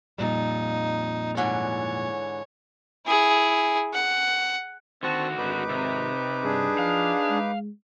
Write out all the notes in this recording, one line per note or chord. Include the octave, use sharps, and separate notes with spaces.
F2 A#2 G3 D#4
G#2 D3 E3 C#5
E4 G#4
F#5
D3 D#3 C4 F#4 A5 C#6
G#1 D#4 B4 D6
C3
G2 D4 G#4
F3 F5
G#3